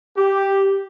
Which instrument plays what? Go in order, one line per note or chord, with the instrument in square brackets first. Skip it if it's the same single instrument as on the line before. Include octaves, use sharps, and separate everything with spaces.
[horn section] G4